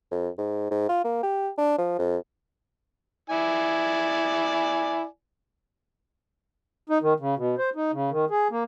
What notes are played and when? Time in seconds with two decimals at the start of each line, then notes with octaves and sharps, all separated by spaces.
0.11 F2
0.38 G#2
0.71 G#2
0.89 F4
1.04 A#3
1.23 G4
1.58 D4
1.78 F3
1.99 F2
3.30 E4 D5 G#5
6.89 D#4
7.02 D#3
7.20 C#3
7.37 B2
7.58 C5
7.75 D#4
7.93 C#3
8.11 D#3
8.30 G#4
8.51 A#3